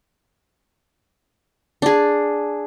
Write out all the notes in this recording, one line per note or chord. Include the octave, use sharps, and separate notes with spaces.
D4 G#4